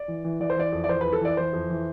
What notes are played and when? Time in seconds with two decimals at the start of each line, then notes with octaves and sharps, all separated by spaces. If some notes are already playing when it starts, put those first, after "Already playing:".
Already playing: D5
0.08 E3
0.24 E3
0.40 E3 D5
0.50 C5
0.56 E3 D5
0.72 F2
0.84 D5
0.89 E3 C5
1.01 F2 B4
1.13 A4
1.21 E3 D5
1.37 E3 C5
1.53 F2
1.70 E3